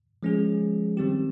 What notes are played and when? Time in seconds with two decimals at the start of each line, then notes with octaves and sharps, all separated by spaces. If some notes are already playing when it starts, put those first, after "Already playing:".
0.23 F3 G#3 C#4 G#4
0.97 D#3 G3 C4 G4